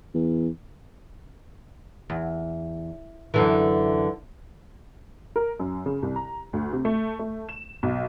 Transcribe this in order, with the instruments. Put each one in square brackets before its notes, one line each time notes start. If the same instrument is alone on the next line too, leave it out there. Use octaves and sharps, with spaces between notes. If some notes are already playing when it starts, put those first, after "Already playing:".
[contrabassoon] E2
[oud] E2
F#2 D3 E3
[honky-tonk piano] A#4
F#2
C#3
C2
A#5
D2
C3
A3
A3
E7
B1